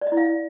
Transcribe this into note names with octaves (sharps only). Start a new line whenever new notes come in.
D5
D#5
E4
F5